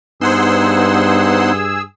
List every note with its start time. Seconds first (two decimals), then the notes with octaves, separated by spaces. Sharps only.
0.21 G2 B3 D#4 G#4 C5 F#5 C6 E6